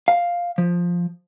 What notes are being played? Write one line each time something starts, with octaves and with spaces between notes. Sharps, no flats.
F5
F3